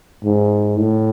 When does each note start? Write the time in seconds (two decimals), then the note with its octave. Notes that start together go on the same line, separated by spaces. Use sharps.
0.24 G#2
0.78 A2